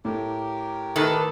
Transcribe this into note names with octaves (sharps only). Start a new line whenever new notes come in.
A2 G4 A#4
D#3 A4 B4